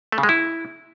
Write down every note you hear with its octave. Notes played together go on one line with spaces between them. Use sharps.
A3
C#3
G#3
E4